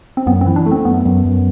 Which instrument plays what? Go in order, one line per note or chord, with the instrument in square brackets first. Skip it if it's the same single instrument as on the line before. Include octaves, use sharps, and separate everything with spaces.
[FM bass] C4
[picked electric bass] F#2 [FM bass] B3
[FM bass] C4
[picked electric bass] E3
[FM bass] D4
[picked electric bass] A3
[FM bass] C4
[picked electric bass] F#2 [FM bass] B3
[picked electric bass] F#2
F#2